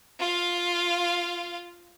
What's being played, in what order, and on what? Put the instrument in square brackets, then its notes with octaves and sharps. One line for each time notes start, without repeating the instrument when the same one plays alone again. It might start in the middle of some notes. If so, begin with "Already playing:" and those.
[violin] F4 F5